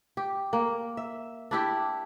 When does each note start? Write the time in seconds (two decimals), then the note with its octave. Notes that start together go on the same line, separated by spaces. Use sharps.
0.17 G4
0.53 A#3
0.97 E5
1.51 D4 E4 G4